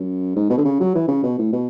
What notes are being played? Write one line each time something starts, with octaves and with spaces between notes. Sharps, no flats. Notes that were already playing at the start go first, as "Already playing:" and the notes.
Already playing: F#2
G#2
B2
D3
C#3
F#3
E3
C#3
B2
A2
B2